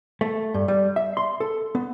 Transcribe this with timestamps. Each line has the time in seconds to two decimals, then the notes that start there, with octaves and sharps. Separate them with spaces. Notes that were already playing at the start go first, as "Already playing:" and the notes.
0.21 A3
0.54 G2
0.68 G3
0.96 E5
1.17 C6
1.40 A4
1.75 B3